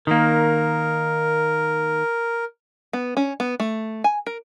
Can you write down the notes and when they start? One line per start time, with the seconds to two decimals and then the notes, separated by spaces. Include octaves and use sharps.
0.07 D#3 A#3 A#4
2.93 B3
3.17 C#4
3.40 B3
3.60 A3
4.04 G#5
4.27 A#4